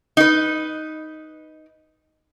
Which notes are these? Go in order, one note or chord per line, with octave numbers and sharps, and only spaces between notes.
D#4 B4